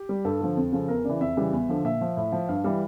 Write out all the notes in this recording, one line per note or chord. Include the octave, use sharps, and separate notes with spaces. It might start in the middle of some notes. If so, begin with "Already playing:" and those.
Already playing: G4
G3
G2 A4
D3 F3
F2
C#3 F3
E2 A#4
C#3 E3 D5
F2 E5
C#3 E3 G3
E2
D3 F3
A#2 E5
F3
A2
F3
G2 F5
E3 G3